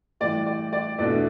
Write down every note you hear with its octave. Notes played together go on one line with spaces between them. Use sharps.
A2 E3 G3 D5
D5
D5
E2 B2 A3 D4 D5